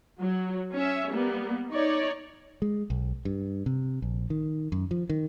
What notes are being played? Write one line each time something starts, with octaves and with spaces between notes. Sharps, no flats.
F#3
C#4 E5
G3 A#3 B3
D#4 C#5 D5
G#3
B1
G2
C3
A#1
D#3
F#2
F3
D#3